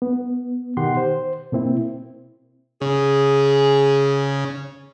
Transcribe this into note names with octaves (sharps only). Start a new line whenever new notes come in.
B3
B2 D#3 G4 F#5 C6
C5
B2 A#3 C4 E4
C#3 G#4